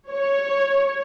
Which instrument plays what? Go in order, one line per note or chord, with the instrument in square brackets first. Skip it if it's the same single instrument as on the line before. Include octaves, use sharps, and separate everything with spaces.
[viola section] C#5